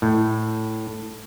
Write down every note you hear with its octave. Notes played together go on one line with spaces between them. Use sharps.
A2